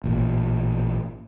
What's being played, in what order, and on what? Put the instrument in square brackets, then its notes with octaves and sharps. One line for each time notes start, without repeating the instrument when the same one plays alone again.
[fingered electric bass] A1 A#2